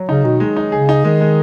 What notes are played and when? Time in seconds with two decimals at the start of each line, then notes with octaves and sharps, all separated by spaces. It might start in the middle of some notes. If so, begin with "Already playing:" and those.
Already playing: F#3
0.09 C#3 D#4
0.24 B2 D#3
0.40 G#3
0.56 D#4
0.72 C#3 G#4
0.89 D#4
1.04 D#3 G#3
1.21 G#3